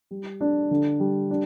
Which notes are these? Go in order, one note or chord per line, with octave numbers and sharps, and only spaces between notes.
G3
D4
D3
G3
D4